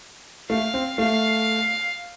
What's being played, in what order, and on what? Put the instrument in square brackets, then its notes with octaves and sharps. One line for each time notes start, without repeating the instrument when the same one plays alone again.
[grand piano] A3 [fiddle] F5
[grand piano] C4
[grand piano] A3 [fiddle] F5